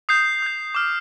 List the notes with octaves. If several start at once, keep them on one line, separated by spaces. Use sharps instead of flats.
D#6 G6 C7
D#6 G6
D6 F6